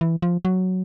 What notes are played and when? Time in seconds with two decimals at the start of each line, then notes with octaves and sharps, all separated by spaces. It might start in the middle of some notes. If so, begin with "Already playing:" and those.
0.01 E3
0.22 F3
0.45 F#3